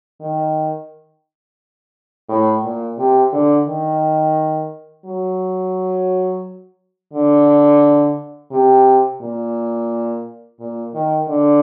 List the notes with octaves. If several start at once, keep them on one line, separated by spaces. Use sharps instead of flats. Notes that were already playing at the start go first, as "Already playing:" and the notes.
D#3
A2
A#2
C3
D3
D#3
F#3
D3
C3
A#2
A#2
D#3
D3